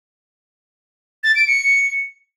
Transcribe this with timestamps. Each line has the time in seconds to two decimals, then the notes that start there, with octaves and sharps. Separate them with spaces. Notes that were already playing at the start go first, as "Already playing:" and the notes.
1.23 A6
1.35 D7
1.47 C#7